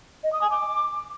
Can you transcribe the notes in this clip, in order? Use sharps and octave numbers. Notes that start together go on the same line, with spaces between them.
D#5
D#6
G#5
D6